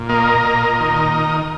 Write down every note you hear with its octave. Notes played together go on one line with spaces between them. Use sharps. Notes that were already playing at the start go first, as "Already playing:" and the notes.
Already playing: A#2
A#3 A#4 D#5
A#2
D#3